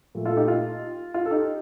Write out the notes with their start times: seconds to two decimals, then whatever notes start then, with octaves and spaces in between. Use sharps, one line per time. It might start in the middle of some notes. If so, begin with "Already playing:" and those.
0.15 A#2 A3
0.25 F4 A4
0.37 D#4 G4
0.48 F4
1.14 F4
1.26 A4
1.31 D#4 G4